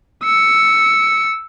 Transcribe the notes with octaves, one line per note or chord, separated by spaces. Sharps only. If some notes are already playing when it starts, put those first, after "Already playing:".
E6 C#7